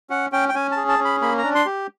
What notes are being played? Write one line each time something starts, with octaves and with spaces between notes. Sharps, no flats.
C#4 F#5
C#4 G5
G5
C#4 G#5
A5
G#4
A5
C#4
B5
A#3 B5
A#5
D4
C6
G4